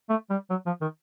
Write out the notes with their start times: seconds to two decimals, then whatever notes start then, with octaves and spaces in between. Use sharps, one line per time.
0.09 A3
0.30 G3
0.50 F#3
0.66 F3
0.81 D#3